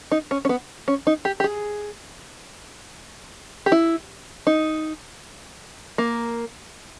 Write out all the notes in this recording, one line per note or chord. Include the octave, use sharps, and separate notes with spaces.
D#4
C#4
C#4
B3
C#4
D#4
G4
G4
G#4
G4
E4
D#4
A#3